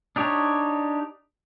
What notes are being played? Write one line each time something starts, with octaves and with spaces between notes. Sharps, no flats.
D4 D#4 G4 C#5